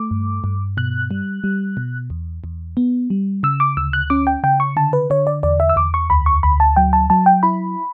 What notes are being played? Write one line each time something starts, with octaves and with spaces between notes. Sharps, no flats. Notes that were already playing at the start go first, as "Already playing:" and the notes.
Already playing: A3 D6
G2
G2
B2 F#6
G3
G3
B2
E2
E2
B3
G3
C#3 E6
D6
D2 E6
F#6
C#4 D6
G5
C#3 G5
C#6
D3 A5
B4
D3 C#5
D5
E2 D5
E5
E6
E2 D6
C#6
D2 B5
C#6
D2 B5
A5
F#3 G5
A5
F#3 A5
G5
E4 B5